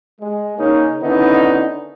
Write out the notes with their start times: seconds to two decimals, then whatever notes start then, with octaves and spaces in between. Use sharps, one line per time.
0.21 G#3
0.58 C#3 A#3 C#4 D#4
1.02 D3 D#3 B3 C#4 D#4 E4